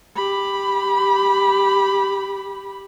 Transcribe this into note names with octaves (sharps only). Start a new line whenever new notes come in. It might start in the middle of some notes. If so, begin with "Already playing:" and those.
G4 B5